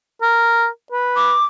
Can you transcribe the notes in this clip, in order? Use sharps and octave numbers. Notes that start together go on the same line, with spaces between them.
A#4
B4
D6